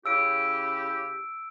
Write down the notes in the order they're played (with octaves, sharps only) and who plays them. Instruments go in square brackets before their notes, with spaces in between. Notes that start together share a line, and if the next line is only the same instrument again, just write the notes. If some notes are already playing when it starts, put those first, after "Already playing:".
[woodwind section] C#3 E4 G4 [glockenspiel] E6 D7